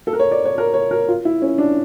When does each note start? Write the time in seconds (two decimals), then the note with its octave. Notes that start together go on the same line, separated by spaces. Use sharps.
0.07 A4
0.13 A#4
0.19 C#5
0.31 D5
0.45 C#5
0.58 A#4
0.74 C#5
0.91 A#4
1.08 F4
1.25 E4
1.42 C#4
1.58 D4